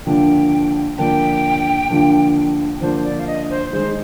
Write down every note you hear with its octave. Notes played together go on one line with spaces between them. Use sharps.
D3 F3 A#3 D4 G5
D3 F3 A#3 D4 G5
D3 F3 A#3 D4
D3 F3 A#3 D4 C5
D5
F5
D#5
C5
D#3 G#3 D#4 G#4 C5